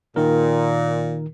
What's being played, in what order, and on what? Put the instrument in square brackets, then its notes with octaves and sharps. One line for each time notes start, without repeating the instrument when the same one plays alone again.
[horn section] A#2 [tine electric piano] D#3 A#4